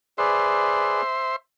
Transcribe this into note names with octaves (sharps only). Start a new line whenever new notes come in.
G#4 B4 C5 D5 E5 C6